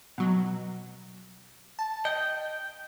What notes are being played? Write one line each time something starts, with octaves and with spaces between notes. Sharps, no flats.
B2 F#3
A5
D#5 G5